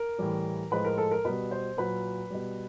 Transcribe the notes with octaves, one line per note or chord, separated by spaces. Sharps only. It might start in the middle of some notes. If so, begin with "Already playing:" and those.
Already playing: A#4
A2 E3 G3
A2 F3 G#3 B4
A#4
A4
A#4
B2 G3 B4
C5
A#2 F#3 B4
B2 G3